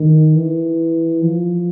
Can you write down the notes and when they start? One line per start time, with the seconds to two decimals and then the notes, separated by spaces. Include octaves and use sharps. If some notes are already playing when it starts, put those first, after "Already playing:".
Already playing: D#3
0.35 E3
1.22 F3